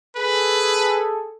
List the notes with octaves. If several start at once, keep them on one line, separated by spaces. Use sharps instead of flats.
G#4 A4 B4